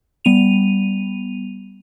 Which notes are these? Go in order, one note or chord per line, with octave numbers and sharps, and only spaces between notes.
G3 B3 D#7 F7